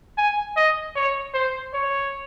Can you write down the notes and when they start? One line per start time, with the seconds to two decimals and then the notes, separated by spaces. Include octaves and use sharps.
0.17 G#5
0.57 D#5
0.96 C#5
1.34 C5
1.74 C#5